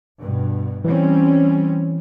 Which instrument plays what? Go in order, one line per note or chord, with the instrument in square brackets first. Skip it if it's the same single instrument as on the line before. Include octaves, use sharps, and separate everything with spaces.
[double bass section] G2 B2
[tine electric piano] E3 [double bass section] G3 C4 C#4